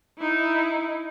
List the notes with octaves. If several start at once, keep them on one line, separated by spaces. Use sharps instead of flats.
D#4 E4